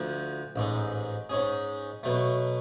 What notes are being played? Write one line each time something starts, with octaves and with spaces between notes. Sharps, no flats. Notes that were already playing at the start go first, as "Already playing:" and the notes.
Already playing: D2 D3 F3
A1 G#2 G#3
G#2 G#3 C#4 G#4
B2 F#3 A3